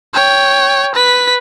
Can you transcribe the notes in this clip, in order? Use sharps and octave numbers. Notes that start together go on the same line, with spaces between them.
C#5 G5
B4 B6